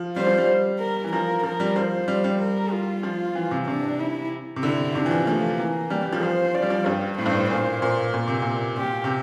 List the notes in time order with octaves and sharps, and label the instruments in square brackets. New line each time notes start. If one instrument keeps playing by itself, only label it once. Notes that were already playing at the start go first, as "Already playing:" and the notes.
Already playing: [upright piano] F3
[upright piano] G3 [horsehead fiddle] C5
[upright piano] F3
G3
[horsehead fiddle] A#4
[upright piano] E3
[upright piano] F3 [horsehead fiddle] A#4
[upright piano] F3 [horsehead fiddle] A#4
[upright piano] G3
[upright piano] F3 [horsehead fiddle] C5
[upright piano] G3
G3
[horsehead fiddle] A#4
F4
[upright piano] F3
E3
C3
[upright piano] C3 [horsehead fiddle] D4
[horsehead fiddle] E4
[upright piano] C3
[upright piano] D3 [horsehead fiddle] E4
[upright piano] C3 [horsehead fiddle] D4
[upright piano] E3
F3
[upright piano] F3 [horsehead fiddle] A3
[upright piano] E3 [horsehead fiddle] A#3
[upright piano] G3 [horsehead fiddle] G4
[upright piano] G3
F3
[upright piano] F3 [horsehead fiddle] C5
[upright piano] F3 [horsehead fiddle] D5
[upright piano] G3
F3
[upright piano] G2 [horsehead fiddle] G4
[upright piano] A2 [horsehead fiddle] C5
[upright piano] G2
A2
[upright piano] A#2 [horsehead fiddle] C5
[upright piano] A#2
A#2
C3
A#2
[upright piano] A#2 [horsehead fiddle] G4
[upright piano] C3